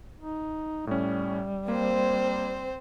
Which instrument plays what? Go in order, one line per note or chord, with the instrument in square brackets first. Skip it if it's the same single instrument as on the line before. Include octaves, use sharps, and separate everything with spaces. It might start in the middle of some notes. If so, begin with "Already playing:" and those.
[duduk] D#4
[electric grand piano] A2 C#4 [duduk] G3
[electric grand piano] A#3 [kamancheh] C4 C5